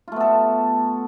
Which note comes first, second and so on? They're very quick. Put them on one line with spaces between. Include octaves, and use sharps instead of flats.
F4 A3 B3 A4